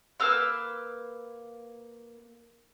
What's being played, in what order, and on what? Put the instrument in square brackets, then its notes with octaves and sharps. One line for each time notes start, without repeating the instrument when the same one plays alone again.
[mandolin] A#3 B4 E6 F6